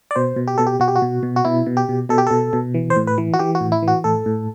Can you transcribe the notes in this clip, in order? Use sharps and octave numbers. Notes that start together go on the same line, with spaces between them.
D5
B2 C5
B2
G4
B2 A4
G4
B2 F#4
G4
F#4
B2
B2
F#4
B2 E4
B2
G4
B2
B2 A4
G4
B2 A4
B2
E3
C5
A2
B4
E3
F#4
E3 G4
F#4
A2
E4
E3
F#4
A2 A4
A2